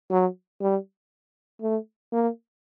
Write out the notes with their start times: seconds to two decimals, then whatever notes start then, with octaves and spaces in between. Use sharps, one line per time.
0.11 F#3
0.61 G3
1.62 A3
2.13 A#3